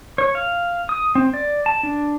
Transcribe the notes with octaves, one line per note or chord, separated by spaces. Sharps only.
C#5
F5
D#6
C4
D5
A5
D4